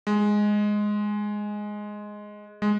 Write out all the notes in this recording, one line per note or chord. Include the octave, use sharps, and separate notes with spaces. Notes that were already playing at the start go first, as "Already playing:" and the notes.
G#3
G#3